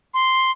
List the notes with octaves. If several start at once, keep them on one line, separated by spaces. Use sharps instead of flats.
C6